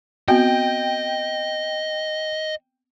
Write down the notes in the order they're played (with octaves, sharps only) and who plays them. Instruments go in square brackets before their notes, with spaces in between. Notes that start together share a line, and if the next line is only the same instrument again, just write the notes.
[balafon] B3 C4 F#4 [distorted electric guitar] D#5 [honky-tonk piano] G5